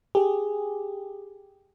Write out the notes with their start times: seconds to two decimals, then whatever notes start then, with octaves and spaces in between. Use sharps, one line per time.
0.15 G4 G#4